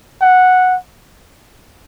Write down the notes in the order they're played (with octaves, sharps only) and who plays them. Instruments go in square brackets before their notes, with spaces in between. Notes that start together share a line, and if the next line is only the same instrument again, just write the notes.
[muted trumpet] F#5